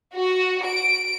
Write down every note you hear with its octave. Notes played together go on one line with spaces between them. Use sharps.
F#4
D7